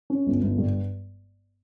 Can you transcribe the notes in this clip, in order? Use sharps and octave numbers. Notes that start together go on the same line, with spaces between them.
C#4
G1
G1
G2